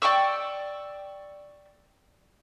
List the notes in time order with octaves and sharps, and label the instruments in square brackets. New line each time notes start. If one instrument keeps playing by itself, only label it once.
[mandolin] D5 G5 C#6 E6